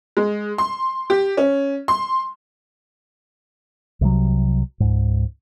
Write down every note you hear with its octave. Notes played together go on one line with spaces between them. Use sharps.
G#3
C6
G4
C#4
C6
C2 C3 E3 F#3
C#2 G#2